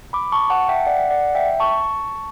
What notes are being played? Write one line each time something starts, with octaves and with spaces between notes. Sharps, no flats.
B5 D6
A5 C#6
F#5 A5
E5 G5
D5 F#5
D5 F#5
E5 G5
A5 C#6